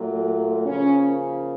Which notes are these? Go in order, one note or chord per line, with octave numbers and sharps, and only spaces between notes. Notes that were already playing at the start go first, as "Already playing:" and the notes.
Already playing: A#2 F#3 A3
C#3 F3 A#3 C#4